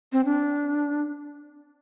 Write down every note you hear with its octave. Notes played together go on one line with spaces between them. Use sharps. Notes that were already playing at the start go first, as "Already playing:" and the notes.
C4
D4